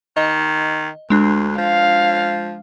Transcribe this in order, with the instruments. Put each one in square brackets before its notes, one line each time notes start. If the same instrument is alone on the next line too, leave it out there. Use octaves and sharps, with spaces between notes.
[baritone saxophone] D#3 [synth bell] D#5
[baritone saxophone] D2 [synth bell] G#3 D4
[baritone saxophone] F3 [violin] F5